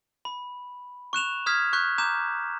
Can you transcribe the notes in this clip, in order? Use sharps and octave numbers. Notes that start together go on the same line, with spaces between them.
B5
C#6 F#6 E7 F7
D#6 F6 G#6 B6
C#6 F#6 G6 B6
A#5 D6 G6 E7